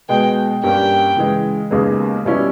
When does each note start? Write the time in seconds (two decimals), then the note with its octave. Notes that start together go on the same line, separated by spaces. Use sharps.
0.09 B2 G#3 B3 G5
0.63 G2 G3 A#3 C#4 G5
1.16 C#3 E3 G#3
1.70 D#2 C#3 G#3 B3
2.25 B2 G3 C#4 E4